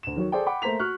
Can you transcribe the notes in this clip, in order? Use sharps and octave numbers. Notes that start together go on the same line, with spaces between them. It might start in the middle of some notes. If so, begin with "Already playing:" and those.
D2 E7
D#3 F#3 F#4 C#5
G#4 A4 C5 D5 G5
F#5 G5 B5 D6
A3 A#3 C5 A#5 B6 F7
F#4 C#6 F6 F#6